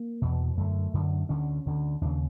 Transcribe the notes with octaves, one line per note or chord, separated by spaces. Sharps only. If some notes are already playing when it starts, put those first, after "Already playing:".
Already playing: A#3
E2 B2
F#2 D3 A3
F#2 D3
D2 D3 C#4
D2 D3
D#2 C#3 D4